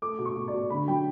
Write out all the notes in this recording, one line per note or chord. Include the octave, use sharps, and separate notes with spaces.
A3 D6
B2
C#6
B2
D5
B2
D3 B5
F#3 G5